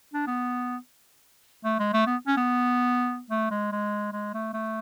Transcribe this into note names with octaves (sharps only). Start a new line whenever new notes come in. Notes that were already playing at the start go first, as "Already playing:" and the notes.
D4
B3
A3
G#3
A3
B3
C#4
B3
A3
G#3
G#3
G#3
A3
A3